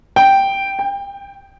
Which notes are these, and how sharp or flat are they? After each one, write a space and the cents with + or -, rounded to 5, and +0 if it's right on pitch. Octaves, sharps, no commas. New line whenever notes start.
G5 -5
G5 +25